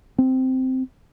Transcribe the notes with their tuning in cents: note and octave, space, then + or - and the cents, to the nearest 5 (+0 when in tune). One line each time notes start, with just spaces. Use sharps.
C4 -10